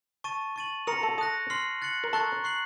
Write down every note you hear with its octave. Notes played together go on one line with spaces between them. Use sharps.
A5 C#6 A6 D#7
C#6 A6 D#7 F#7
A#4 C6 D#6 A#6 C#7 F7
A4
A4 D#6 F#6 A#6
C6 F6 C7 F#7
F#6 A6 C#7 F#7
A#4
A4 A#5 C#6 F#6 A6
C#6 F#6 C7 F#7